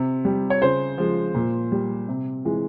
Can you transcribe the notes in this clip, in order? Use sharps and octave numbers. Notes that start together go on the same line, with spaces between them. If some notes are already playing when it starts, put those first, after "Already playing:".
Already playing: C3
G3
C#5
C#3 C5
F3 G#3
A#2
G3
C3
E3 G#3